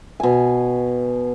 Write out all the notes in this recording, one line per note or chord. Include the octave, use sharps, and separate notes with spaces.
B2 G#5